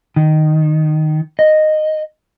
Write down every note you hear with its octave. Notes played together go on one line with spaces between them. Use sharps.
D#3
D#5